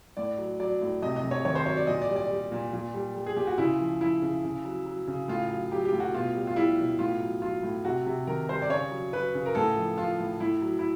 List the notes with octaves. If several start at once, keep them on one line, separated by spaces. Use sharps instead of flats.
A2 D5
F#3
F#3 D5
A2
C3 D#5
D#5
C3
C#5
D#3 C#5
C5
F#3 C#5
D5
A#2 D#5
D5
G3
D5
G3
A#2
A#2
G3
G3
G#4
A#2 G4
F#4
C#3 E4
F3
F3 E4
C#3
C#3
F#3
F#3
C#3
A2 F4
F#3
F#3 G4
G4
A2
F#4
B2 F4
G3
F4
G3 E4
B2
A2 F4
F#3
F#3 F4
A2
C3 F#4
C3
D#3 A#4
G3 C5
D5
C#3 C#5
F#3
F#3 B4
C#3
A#4
A2 A4
F3
F3 F4
A2
A2 E4
F#3
E4